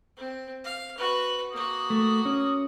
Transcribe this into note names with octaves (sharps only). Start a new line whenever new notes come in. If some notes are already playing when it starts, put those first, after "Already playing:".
C4
F5
F#4 B4
A#3 F#4 D#6
A3
C#4